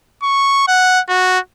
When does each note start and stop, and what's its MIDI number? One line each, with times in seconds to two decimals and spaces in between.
0.23 0.65 85
0.68 1.00 78
1.09 1.39 66